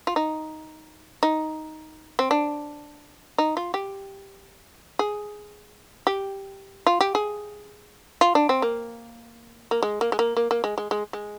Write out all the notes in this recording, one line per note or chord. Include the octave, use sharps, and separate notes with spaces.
F4
D#4
D#4
C4
D4
D#4
F4
G4
G#4
G4
F4
G4
G#4
F4
D4
C4
A#3
A#3
G#3
A#3
G#3
A#3
A#3
A#3
G#3
G#3
G#3
G#3